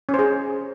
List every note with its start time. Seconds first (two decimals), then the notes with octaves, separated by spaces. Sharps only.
0.09 C#4
0.14 C5
0.19 G#4